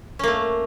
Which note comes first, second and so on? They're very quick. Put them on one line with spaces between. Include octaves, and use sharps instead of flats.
C#4 A#3 A3